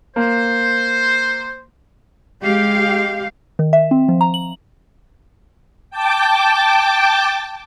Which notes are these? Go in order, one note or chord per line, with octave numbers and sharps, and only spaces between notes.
A#3 C5
G#3 G4 F5
D#3
E5
C4
F3
A#5
F#7
G5 A5 D6